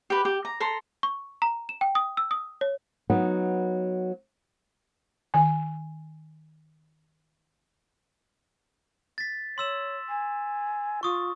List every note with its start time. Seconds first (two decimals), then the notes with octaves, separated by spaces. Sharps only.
0.10 G4 B4
0.25 G4
0.45 A#5
0.60 A4 A#5 C6
1.03 C#6
1.42 A#5
1.69 E7
1.81 G5
1.95 D#6
2.17 E6
2.31 D#6
2.61 C#5
3.10 F#3 B3 D#4
5.34 D#3 G#5
9.18 A6 B6
9.58 C#5 C6 E6 E7
10.09 G#5
11.03 F4 C#6 D#6